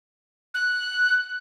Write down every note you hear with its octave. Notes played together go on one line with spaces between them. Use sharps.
F#6